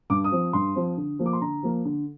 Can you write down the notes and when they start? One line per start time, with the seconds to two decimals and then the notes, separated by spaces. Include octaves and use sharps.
0.10 G2 D6
0.24 D#6
0.32 F3 C4
0.53 G2 C6
0.75 F3 C4
0.97 D3
1.19 F3 A#3
1.26 D6
1.33 C6
1.41 D3 A#5
1.63 F3 A#3
1.85 D3